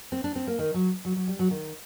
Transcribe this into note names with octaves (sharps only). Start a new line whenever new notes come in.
C4
D4
C4
A#3
D#3
F#3
F#3
F#3
G3
F#3
D#3